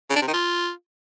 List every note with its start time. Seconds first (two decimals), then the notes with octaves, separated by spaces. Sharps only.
0.10 C#3
0.16 D4
0.22 C3
0.28 D#3
0.33 F4